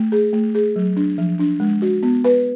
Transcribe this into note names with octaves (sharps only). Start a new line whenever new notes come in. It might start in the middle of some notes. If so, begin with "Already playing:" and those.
Already playing: A3
G#4
A3
G#4
F#3
D4
F3
D4
G#3
F#4
B3
B4